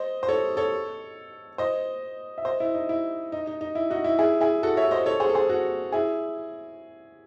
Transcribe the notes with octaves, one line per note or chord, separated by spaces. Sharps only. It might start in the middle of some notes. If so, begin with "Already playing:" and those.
Already playing: C5 D#5
C5
A4 C#5
A4 C#5
C5 D#5
E5
C5 D#5
E4
D#4
E4
D#4
D#4
D#4
E4
D#4 F#4
E4
E4 G#4
E4 G#4
F#4 A4
C#5 E5
C5 D#5
A4 C#5
G#4 C5
A4
G#4 C5
F#4 A4
E4 G#4